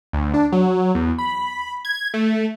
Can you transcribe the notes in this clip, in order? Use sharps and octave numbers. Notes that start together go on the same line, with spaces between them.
D2
D4
F#3
E2
B5
G#6
A3